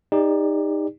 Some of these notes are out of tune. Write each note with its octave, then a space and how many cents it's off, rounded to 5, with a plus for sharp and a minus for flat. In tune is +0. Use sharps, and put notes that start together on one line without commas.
D#4 +0 G4 +40 D5 +0